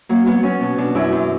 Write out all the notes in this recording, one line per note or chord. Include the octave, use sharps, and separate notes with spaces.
F#3 A#3
F#3 B3
F#3 C#4
B2
B2 D4
F#2 E4
F#2